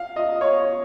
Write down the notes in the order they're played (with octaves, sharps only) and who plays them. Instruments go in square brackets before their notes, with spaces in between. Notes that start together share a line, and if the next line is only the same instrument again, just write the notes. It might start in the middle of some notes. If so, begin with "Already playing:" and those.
Already playing: [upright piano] F5
D#5
C#5